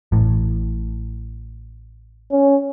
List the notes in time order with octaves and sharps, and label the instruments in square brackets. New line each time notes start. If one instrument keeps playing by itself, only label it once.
[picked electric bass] A1 A2
[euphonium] C#4